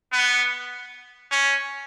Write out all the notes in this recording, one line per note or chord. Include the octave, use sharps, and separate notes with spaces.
B3
C#4